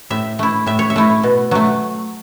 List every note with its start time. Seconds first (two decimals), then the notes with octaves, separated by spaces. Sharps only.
0.10 A2 E5
0.39 A3 E4
0.66 A2 E5
0.79 C#5
0.90 E5
0.96 A3 E4
1.23 B2
1.51 F#3 A3